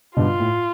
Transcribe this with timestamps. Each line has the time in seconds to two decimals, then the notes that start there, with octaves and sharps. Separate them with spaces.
0.17 G2 B2 F4
0.40 A2